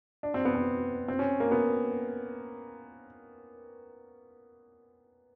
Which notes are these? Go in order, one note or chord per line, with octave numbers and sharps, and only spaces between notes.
D4
C4
B3
C4
C4
C#4
A#3
B3